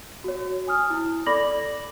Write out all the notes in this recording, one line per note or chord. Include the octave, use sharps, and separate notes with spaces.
F#4 C#5
G#5 D#6 F6
E4
A4 D5 B5 D6 A#6 F#7